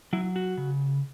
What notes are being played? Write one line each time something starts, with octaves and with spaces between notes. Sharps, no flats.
F#3 E4
F#4
C#3